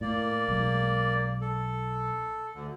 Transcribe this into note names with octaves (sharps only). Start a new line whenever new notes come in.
A2 A#3 D5
B1 G#3
A4
D2 D3